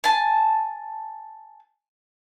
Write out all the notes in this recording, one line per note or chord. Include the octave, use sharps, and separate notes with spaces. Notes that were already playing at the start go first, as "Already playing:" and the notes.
G#5 A5